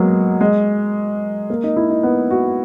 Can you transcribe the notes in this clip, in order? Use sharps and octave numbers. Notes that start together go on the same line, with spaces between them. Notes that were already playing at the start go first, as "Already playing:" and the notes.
Already playing: F#3 G#3 A#3 B3
G#3
A#3
D#4
E4
D#4
B3
F#4